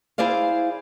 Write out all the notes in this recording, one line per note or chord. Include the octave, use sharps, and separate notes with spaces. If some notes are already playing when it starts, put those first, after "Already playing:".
E4 G#4 C5 D5 F5